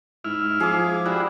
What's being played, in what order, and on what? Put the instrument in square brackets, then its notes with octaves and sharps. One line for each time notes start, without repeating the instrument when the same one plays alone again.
[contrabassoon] G#2 [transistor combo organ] E4 F6
[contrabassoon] F3 [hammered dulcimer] G#4 D6
[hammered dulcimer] G3 [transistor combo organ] E4 F#4